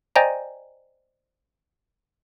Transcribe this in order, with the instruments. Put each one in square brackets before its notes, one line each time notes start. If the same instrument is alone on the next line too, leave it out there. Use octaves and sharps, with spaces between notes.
[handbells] C5 D5 D#5 G5 G#5 A#5